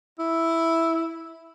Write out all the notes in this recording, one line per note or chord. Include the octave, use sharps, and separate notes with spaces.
E4